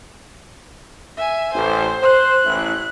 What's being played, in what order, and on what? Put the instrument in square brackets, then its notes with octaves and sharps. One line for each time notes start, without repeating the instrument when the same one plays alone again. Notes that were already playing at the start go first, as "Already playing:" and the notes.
[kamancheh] E5 G#5
[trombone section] A1 [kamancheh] C5
[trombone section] C5 [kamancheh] F#6
[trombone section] A1 E4